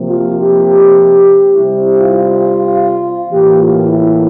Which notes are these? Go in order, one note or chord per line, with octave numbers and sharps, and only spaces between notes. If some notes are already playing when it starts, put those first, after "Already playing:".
Already playing: C3 F3 A#3
F4
G4
C3 G3 C4 E4
F4
A2 E3 A#3 G4
F4
E4